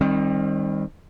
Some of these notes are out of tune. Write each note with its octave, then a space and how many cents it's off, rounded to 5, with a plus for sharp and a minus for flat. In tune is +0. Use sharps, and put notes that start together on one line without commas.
D#3 +0 G3 +30 C4 +35